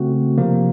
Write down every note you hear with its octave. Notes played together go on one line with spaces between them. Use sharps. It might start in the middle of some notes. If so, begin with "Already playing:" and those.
Already playing: C#3 A3 C4 F#4
C3 F3 A#3